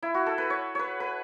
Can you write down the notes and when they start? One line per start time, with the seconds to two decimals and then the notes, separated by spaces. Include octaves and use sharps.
0.03 E4
0.14 F#4
0.26 A4
0.38 B4
0.50 C#5
0.75 B4 C#5
1.00 B4